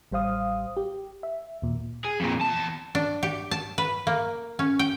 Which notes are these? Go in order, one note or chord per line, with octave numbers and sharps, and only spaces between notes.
A1 G3 C5 F5 D#6
G4
E5
D#2 A#2
G#4
F2 A#2
E2 A5
D4
G4
A5
B4
A#3
C#4
G5